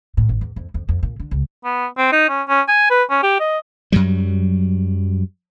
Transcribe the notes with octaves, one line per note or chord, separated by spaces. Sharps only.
A2
G#1
E2
F2
F2
F2
A#2
D3
C#2
B3
C4
D#4
C#4
C#4
G#5
B4
C#4
G4
D#5
F#2 F#3 G3